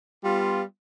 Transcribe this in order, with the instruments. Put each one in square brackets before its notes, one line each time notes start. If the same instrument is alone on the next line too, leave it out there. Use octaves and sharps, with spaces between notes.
[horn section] G3 B3 F4